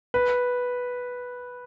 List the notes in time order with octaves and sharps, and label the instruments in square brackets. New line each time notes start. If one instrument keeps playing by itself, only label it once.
[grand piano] B4